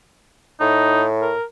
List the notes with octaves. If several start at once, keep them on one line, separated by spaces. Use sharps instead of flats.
A2 D#4
A#4